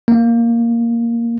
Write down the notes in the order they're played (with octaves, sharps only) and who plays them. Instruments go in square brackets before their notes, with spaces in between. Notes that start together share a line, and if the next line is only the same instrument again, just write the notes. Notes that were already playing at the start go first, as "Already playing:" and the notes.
[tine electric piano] A#3